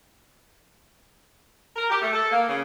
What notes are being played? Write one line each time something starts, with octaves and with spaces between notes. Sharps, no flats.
A#4
G4
A3
A4
A#3
C#3